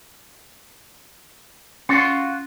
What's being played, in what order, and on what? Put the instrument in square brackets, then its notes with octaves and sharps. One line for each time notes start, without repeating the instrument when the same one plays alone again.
[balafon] C#4 [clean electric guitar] F4 F#4